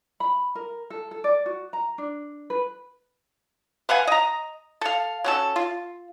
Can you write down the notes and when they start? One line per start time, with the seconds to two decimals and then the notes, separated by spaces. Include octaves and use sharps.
0.20 B5
0.55 A#4
0.90 A4
1.11 A4
1.24 D5
1.46 F#4
1.73 A#5
1.98 D4
2.50 B4
3.89 B4 F5 F#5 G#5
4.07 D#5 A#5
4.81 A4 F5
5.24 F#3 C#4 A4
5.56 F4